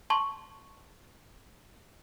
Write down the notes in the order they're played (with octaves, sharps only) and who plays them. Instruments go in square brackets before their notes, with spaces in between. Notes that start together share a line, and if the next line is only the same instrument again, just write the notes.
[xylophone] A5 C6 C#6 F#7